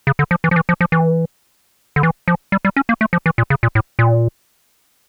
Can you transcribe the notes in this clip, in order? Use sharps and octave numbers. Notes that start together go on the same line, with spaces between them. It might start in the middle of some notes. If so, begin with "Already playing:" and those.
C#3
D3
F3
E3
F3
E3
F3
F3
E3
D3
E3
F3
G3
G3
C#4
A#3
A3
F3
E3
A#2
C#3
A#2
A2
A#2